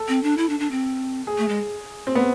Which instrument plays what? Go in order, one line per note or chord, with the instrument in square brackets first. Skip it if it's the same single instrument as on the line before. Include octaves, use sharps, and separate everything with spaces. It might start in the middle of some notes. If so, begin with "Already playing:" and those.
Already playing: [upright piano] A4
[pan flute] C4
D4
E4
D4
D4
C4
[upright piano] G#4
[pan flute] A3
G#3
[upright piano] C4
B3